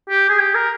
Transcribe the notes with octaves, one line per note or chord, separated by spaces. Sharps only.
G4
G#4
G4
A#4